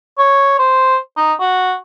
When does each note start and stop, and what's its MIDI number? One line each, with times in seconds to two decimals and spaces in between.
0.18 0.58 73
0.59 0.97 72
1.17 1.33 63
1.40 1.76 66